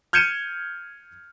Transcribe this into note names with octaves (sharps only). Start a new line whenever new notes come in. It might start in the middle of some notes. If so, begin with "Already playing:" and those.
F6 G6 G#6 C#7 D#7 E7